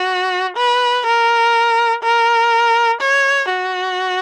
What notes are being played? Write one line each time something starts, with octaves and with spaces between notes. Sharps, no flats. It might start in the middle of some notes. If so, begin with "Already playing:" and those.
Already playing: F#4
B4
A#4
A#4
C#5
F#4